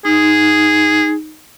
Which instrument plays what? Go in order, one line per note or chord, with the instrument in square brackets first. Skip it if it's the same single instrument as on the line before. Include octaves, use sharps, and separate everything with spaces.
[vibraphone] D#4 [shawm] G#4